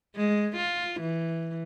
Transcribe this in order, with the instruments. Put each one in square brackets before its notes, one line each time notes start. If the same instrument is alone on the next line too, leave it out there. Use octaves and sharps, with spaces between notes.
[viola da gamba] G#3
F4
E3